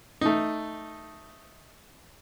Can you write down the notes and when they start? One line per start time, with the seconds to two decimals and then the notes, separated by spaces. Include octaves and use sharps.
0.21 A3 D#4